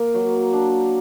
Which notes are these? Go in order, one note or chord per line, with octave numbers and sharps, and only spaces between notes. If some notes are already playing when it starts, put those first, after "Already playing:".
Already playing: A#3
F#3
D4